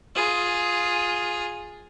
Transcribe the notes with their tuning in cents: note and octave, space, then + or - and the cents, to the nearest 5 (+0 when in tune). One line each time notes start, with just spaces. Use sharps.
F4 +15 G#4 +0